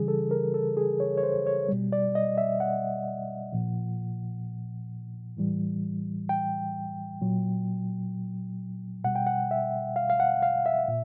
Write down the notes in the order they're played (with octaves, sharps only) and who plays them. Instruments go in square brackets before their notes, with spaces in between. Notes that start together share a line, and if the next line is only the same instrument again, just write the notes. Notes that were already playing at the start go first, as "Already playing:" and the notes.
Already playing: [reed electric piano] C#3 E3 G3 G#4
A4
A#4
A4
G#4
C#5
C#5
C5
C#5
B2 G3
D5
D#5
E5
F#5
A#2 F3
A2 E3 G3
G5
A#2 F#3
B2 G3 F#5
G5
F#5
E5
F5
F5
F#5
F5
E5
A#2